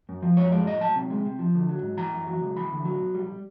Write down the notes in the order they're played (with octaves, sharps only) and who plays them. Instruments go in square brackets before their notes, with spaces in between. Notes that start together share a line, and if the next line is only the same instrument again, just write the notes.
[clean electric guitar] F#2
F3
F#2 C#5
G#3 D5
A2 D#5
F#3 A5
C3
G#3
C3
F3
D2
F#3
G#2
E3 A#5
F#2
F#3
C#2
E3 B5
D2
F#3
B1
G3